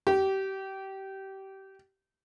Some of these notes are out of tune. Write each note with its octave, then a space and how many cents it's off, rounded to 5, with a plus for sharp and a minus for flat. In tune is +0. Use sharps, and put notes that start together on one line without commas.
G4 -25